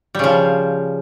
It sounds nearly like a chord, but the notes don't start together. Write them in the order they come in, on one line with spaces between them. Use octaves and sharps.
G3 C#3 F3